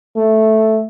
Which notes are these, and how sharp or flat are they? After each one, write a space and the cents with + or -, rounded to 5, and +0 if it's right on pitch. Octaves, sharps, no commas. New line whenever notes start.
A3 -5